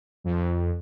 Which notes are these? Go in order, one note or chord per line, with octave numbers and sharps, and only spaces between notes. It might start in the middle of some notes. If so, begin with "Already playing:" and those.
F2